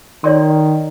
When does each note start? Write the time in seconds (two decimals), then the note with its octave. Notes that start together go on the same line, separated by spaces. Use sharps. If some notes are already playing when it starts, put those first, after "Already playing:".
0.24 D#3 C#5 D5 C6